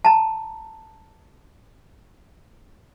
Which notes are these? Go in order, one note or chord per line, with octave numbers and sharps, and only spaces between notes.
A5 A#5